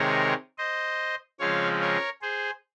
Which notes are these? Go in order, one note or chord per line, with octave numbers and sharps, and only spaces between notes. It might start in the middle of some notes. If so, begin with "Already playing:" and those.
Already playing: C3 D#3 G#3 A#4 C#5
C5 D#5
C#3 F3 G#3 C4 C#5 F5
A#4 C#5
G#4 C5